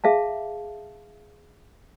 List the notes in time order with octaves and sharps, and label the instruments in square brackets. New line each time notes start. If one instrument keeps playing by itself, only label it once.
[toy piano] G#4 E5 F5 A5